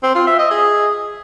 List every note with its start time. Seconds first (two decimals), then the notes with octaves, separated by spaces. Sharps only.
0.03 C4
0.15 F4
0.27 E5
0.39 D#5
0.51 G#4